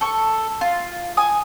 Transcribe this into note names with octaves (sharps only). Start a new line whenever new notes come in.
A4 C#6
F4
G#5 D#6